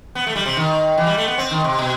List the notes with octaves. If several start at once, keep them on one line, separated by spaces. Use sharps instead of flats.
B3
A3
G3
C3
D#3
E3
G3
A3
B3
C4
D#3
C3
B2